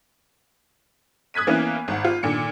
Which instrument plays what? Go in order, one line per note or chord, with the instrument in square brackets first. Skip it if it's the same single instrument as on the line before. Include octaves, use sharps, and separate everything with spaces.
[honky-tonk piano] D#6 F#6 G#6 B6 D#7
E3 A#3 B3 C#4 E4
G#1 F#5
F4
A#2 D3 D#3 C#7